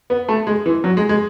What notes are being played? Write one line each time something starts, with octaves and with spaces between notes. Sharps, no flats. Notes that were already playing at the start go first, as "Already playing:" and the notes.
B3
A3
G#3
E3
F#3
G#3
G#3